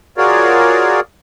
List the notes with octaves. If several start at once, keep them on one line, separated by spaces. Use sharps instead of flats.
F4 F#4 G#4 A#4 C#5 D5